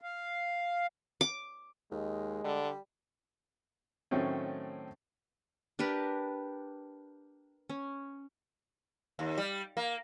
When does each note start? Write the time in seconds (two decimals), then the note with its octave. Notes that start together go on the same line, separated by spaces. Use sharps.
0.01 F5
1.21 D6
1.92 D#2 G#3
2.44 D3 G3
4.11 A2 D#3 F#3 A3 C4 C#4
5.79 D4 G4 A#4 B4
7.69 C#4
9.19 D#2
9.38 G3
9.77 A#3